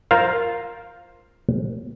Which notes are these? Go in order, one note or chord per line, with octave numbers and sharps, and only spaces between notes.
F4 A#4 C5 F5